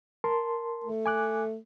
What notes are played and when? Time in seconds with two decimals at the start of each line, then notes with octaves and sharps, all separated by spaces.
0.24 A#4 A5 C6
0.84 A3
1.06 G#5 D6 F#6